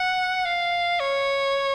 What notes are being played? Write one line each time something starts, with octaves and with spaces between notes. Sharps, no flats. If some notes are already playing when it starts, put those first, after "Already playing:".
Already playing: F#5
F5
C#5